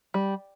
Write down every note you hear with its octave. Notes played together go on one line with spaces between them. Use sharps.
G3